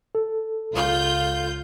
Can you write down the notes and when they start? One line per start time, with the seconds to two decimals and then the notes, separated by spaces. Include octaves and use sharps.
0.15 A4
0.74 C#2 F4 G6